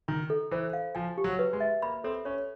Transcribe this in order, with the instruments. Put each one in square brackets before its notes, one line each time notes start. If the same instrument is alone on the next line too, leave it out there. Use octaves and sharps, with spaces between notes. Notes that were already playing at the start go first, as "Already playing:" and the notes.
[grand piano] D#3 [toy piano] A#5
[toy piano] A4
[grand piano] E3 [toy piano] C5
[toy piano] F5
[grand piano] F3 [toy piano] G#5
[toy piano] G4
[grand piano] F#3
[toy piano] B4
[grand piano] G#3
[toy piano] E5
[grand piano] A#3 [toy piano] B5
[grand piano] C4 [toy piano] A4
[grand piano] C#4 [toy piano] C#5